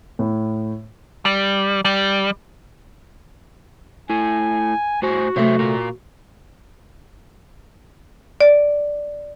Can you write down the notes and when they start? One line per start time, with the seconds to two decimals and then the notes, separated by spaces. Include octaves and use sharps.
0.19 A2
1.25 G3
1.85 G3
4.10 A3 E4 G#5
5.02 A2 F#4 C5 G#5
5.36 C3 F#3 A3 C5 E5
5.59 A#2 F4 A#4
8.41 D5